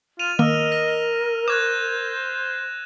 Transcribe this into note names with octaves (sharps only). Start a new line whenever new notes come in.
F4 D#7 F7
D#3 A#3 A#4 D#5 E6 F6
A#6
C5 C#6 D6 F#6 G#6 E7